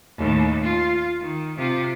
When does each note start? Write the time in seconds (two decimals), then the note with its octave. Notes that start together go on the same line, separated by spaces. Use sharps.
0.18 D#2 A2
0.63 F4
1.21 D#3
1.57 C3 F4